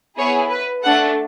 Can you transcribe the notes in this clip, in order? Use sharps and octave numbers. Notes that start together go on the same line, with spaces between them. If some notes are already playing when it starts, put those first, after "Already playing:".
B3 E4 G#4 C#5
B4
A3 D4 A4 F#5